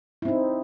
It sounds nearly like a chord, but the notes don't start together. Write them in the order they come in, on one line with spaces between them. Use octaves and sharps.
E4 C4 D#4